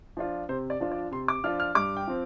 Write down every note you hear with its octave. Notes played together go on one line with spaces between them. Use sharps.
F3 D4 F4
C3 C5
D5
F3 D4 F4
D5
C3 C6
D6
F3 D4 F4 F6
F6
G2 D6
G5
F3 C4